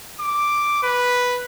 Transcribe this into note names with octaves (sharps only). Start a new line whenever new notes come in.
D6
B4